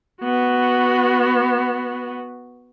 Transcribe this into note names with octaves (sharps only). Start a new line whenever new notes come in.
B3 F#4